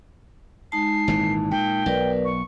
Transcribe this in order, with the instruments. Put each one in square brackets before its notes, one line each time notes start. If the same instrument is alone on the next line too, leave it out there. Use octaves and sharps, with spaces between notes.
[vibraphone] G#3 D#4 A5 [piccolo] C7
[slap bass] G#1 A#2 E3
[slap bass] A#2 [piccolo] G5
[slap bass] B1 [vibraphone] A#4 B4 D5
[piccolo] C#6